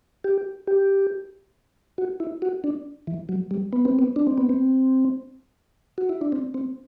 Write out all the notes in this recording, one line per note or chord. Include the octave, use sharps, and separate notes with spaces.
G4
G4
F#4
E4
F#4
D4
E3
F#3
G3
B3
C4
B3
D4
C4
B3
C4
F#4
E4
D4
C4
C4